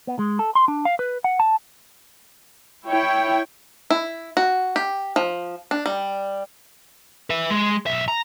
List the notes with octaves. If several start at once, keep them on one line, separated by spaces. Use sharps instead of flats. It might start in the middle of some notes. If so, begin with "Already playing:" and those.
B3
G#3
A4
C6
D4
F5
B4
F#5
A5
E4 C#5 G5
E4
F#4
G4
F3
D4
G3
B4 E5
G#3
B1 E5
A#5